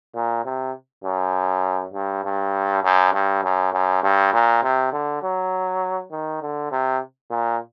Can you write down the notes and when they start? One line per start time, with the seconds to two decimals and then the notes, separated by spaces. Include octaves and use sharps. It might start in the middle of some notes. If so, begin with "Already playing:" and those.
0.15 A#2
0.45 C3
1.04 F#2
1.94 G2
2.24 G2
2.83 F#2
3.13 G2
3.43 F#2
3.73 F#2
4.03 G2
4.33 A#2
4.63 C3
4.93 D3
5.22 F#3
6.11 D#3
6.42 D3
6.71 C3
7.30 A#2